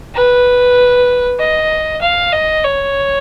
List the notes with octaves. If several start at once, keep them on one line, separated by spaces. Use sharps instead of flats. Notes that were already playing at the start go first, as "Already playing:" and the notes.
B4
D#5
F5
D#5
C#5